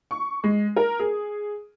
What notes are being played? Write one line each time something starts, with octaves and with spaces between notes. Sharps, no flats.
C#6
G#3
A#4
G#4